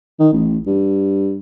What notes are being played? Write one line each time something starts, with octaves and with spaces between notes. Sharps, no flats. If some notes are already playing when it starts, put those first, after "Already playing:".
D#3
A1
G2